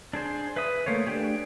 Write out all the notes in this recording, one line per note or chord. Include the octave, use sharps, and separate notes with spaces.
D4 G#4 C5
B4 E5 B5 D#6
A3 A#3 C5 C#5
A3 D4 G4 G#4